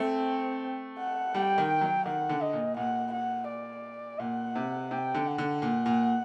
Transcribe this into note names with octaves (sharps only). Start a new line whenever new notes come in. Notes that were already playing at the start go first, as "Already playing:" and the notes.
Already playing: A3 C4
F#5
G3 G5
D#3
F#3
D#3 F#5
D3
D#5
A#2
A#2 F#5
F#5
D5
A#2 F#5
C3
C3 G5
D3
F#5
D3
A#2
A#2